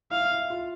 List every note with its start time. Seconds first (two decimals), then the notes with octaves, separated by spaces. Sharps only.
0.11 E4 F5
0.31 E4
0.50 F4